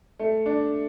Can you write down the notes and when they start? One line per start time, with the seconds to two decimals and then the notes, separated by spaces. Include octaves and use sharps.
0.19 A3
0.46 D4